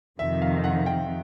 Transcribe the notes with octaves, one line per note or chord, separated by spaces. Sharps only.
F2 C3 D#3 E5
F5
F#5
G5